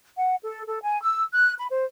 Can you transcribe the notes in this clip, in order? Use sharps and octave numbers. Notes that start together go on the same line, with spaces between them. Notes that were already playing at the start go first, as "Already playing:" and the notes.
F#5
A4
A4
G#5
E6
F#6
B5
C5